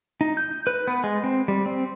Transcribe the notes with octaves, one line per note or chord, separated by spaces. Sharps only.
D#4
G6
B4
B3
G#3
C4
G3
C4